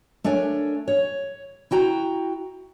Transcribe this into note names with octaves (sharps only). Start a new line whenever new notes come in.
A3 D4 A#4 C#5 G#5
C#5
E4 F#4 G5 A#5